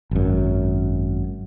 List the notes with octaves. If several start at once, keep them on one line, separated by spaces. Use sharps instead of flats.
G#1 F#2